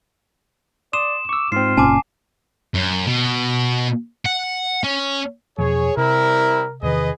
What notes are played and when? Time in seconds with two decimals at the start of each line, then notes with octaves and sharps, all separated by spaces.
0.93 D5 C6 D#6 E7
1.29 C#6 D6 E6
1.52 G#2 C4 F4 C7
1.77 F#1 A#2 C#4 G#5 A5 D6
2.75 F#2
3.07 B2
4.26 F#5
4.84 C#4
5.58 E2 B2 F3 G#4 C#5
5.97 C3 G3 C4 E4 A#4
6.83 E2 C3 D#3 G#4 B4 D#5